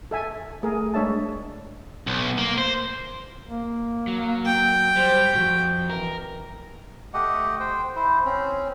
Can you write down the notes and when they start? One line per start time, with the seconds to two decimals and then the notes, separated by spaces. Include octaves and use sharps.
0.11 A4 E5 G#5 A5
0.63 A3 G#4 A#4
0.94 G#3 D4 C#5 E5 A5
2.07 B1
2.38 A#3
2.58 C5
3.49 A#3
4.07 F#3
4.45 G5
4.96 G3 C5
5.33 F2 G#2 F#4
5.90 E3 A#4
7.14 A3 G4 D#5 F#5
7.60 C5 G5
7.96 E4 C5
8.25 C4 C#4